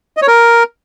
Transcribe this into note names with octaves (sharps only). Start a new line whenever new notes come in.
D#5
C#5
A#4